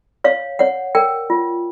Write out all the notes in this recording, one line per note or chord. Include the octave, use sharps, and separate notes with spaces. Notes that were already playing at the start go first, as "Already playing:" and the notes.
C#5 F5
C#5 F#5
A#4 G5
F4